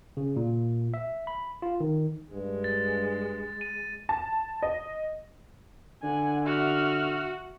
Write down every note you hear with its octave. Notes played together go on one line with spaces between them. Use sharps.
C#3
A#2
E5
B5
F4
D#3
G2 G#3
A6
D#7
A5
D#5
D3 F#5 G#5
F#4 E5 F6